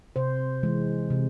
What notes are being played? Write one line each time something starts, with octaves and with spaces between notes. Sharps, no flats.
C3 C5
E3 G#3
C3